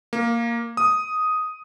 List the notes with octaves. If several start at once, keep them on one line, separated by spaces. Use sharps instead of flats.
A#3
D#6